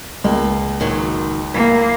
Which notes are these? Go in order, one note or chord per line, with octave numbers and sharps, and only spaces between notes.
C#2 A#3
A#2 D#3 F#3
A#3 E4